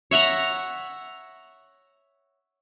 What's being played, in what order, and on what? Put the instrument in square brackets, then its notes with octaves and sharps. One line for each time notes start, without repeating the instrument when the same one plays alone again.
[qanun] C#5 E5 F#5 A#5